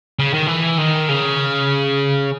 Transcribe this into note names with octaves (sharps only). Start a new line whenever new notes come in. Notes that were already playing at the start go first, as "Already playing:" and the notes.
C#3
D#3
E3
D#3
C#3